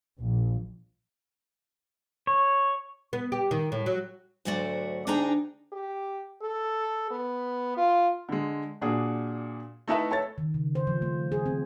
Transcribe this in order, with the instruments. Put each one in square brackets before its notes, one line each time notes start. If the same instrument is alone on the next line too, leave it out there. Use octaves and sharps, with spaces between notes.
[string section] A#1
[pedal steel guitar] C#5
[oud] B3
G4
D#3
A2
F#3
[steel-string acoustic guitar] D2 G#2 F#3 A3 F#4 D5
D2 D4 D#4 G#4 G5 A#5
[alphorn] G4
A4
B3
F4
[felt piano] D3 G#3
A#2 D4 F#4 G#4
A3 D#4 E4 A4 B4 E5
A4 C#5 A6
[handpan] D#3
C#3
C5
F3
A3
G#4
C4